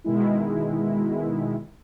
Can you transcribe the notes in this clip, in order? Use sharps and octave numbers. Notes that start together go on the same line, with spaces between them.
B2 D#3 G#3 E4